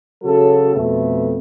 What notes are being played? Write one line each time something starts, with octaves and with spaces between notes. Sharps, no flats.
C#3 F#3 F#4 A4
F2 B2 A3